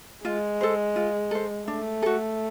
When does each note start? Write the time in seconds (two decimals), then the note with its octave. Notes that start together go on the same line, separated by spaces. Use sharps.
0.25 G#3 F4
0.61 A4 C5
0.96 F4
1.31 A4 C5
1.68 A3 D4
2.02 F#4 A4